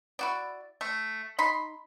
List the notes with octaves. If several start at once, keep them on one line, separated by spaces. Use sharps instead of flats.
E4 F#4 D5
A3
D#4 B5 C6